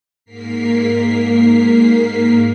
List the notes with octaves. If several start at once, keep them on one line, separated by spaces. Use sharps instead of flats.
G#2 A#3 A#4 B6 C7